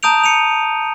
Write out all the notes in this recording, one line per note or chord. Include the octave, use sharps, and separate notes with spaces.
A5 A#5 D#6 G6 D7 F7
C#7 D#7 F7